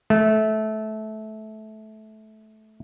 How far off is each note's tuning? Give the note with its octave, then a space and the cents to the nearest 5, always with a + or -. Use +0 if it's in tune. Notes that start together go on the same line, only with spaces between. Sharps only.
A3 -20